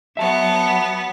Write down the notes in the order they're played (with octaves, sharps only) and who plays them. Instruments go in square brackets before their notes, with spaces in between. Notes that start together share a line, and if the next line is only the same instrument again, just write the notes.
[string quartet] F#3 B3 [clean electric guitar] E5 A5